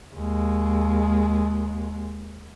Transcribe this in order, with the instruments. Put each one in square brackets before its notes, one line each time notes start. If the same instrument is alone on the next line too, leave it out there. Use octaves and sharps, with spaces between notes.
[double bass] D#2 G#3